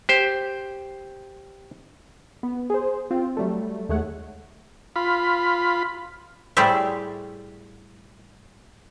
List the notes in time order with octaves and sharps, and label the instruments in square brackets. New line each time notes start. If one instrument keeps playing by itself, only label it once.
[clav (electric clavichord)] G4 C5
[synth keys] B3
G#4 C5
C4 F4
F#3 G3 A3
D#2 G#3 A3 C#5 F#5
[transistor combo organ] F4 B5
[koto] A2 G3 G#4 C5 D5 E5